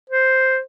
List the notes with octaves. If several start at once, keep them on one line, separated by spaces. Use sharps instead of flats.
C5